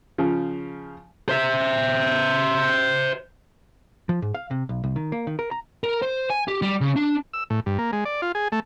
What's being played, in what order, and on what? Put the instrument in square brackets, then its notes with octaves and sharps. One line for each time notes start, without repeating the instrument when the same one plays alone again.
[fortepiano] C#3 F3
[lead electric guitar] C5 E5
[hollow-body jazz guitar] F3
G#2
F5
C3
B1
C2
D#3
A#3
D#3
A#4
A#5
[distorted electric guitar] A#4
C5
G#5
G4
G3
C#3
D4
[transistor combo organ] E6
A2
G2
A#3
G#3
D5
F4
G#4
A3